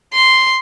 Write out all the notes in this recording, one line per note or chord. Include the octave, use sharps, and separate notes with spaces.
C6